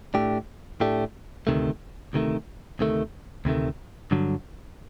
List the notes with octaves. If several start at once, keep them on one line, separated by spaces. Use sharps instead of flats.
A2 A3 D4 G4
A2 A3 D4 G4
D2 C3 D#3 A3
D2 C3 D#3 A3
D2 C3 D#3 A3
D2 C3 D#3 A3
G2 D3 F#3